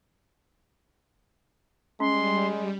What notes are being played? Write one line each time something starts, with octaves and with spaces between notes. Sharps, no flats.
G3 G#3 C#4 C6